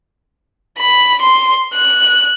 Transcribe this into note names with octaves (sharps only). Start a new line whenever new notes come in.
B5
C6
F#6